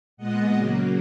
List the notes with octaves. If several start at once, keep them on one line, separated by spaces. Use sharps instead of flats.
A#2 G#3 B3 D#5 F#5
C#3 F#3 A#3